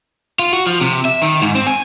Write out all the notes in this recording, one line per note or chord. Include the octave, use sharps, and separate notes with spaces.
F4
F#4
F3
C3
E5
D#3
G#2
C4
G#5